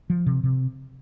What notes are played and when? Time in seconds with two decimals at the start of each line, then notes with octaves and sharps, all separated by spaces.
0.10 F3
0.26 C3
0.44 C3